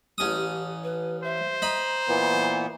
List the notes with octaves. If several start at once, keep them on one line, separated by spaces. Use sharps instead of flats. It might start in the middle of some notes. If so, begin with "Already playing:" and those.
A1 C#4 G4 D#6
B4
C5 E5
D#5 A#5 B5
A#2 E3 B3